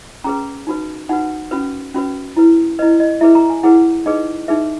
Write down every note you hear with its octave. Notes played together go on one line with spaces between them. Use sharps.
C#4 G#4 B4 A#5
D#4 F#4 B4
D#4 F#4 B4 F#5
C#4 F#4 B4
C#4 F#4 B4
E4 B4
E4 B4 D#5
D#5
E4 G#4 B4 E5
A#5
G#5
E4 G#4 B4 F#5
D#4 G#4 B4 D#5
D#4 G#4 B4 E5